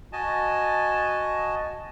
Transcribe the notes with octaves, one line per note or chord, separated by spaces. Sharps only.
F#4 D#5 G#5 A5